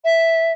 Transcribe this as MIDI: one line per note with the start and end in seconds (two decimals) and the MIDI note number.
0.05 0.52 76